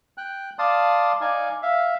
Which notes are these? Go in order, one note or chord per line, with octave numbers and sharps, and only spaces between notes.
G5 F#6
D5 F5 A5 C6 D#6
D#4 D5 F5 G#5
E5 F5